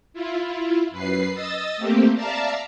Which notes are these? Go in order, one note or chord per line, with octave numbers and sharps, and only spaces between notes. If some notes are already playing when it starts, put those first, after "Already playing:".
E4 F4
F#2 B4 C7
D#5 D#6 E6 A6
A3 A#3 C4 G4
D5 E5 F5 A5 A#5 E6